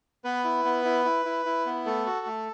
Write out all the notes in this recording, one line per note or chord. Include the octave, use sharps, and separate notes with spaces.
B3 B4
E4
B3
E4
E4
E4
E4
B3
A3 A4
F#4
A3